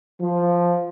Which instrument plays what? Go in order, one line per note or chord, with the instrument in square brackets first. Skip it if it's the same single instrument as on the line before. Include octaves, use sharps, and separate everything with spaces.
[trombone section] F3